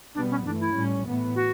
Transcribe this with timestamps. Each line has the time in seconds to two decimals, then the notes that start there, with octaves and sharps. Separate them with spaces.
0.14 B2 G3 B3 D4
0.30 C#4
0.44 G2 E3 A3 D4
0.60 E4
0.75 A2 G3 C#4
1.05 A2 E3 B3
1.35 F#4